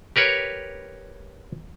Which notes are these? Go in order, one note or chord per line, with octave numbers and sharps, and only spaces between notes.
G4 A#4 B4 C#5